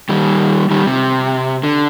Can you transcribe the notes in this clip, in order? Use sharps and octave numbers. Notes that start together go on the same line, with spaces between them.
D#3 G3
D#3 G3
C3
D3